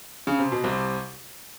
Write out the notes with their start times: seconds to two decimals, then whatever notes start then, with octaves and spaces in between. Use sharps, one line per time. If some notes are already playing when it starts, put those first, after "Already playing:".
0.27 C#3
0.39 C3
0.52 B2
0.64 C2 C3